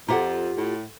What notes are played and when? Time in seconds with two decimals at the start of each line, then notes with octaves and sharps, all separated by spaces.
0.08 F2 F4 G4 A4 F#5 A#5
0.57 A2